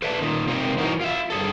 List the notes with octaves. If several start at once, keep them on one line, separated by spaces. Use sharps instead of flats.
A4 B4 D5 E5 G#5 A5
A#2 D#3
C3 D#3 G#3 A#3 C4
E3 D#4 F#4 A#4
F4 E5
G2 G#4 A4